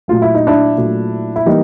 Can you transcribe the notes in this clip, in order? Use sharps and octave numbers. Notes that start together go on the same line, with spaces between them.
A#2 F#3 A3 F4
E4
D#4
D4 E4
A#2 F#3 A3
E4
E3 G3 A#3 D#4